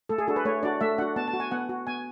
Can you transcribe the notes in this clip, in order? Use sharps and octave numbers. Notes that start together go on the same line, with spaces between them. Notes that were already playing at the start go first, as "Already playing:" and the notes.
A3 A4
G#4
D4 F#4 A4
B4
A3 C#5
D4 F#4 D5
A3 E5
D4 F#4 F#5
B3 A5
A5
F#4
G#5
B3 F#5
F#4
B3 G#5